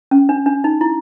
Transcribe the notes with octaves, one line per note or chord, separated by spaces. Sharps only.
C#4
D4
D4
D#4
E4